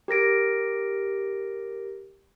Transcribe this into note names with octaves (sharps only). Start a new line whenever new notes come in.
G4 A#4 A#6 D7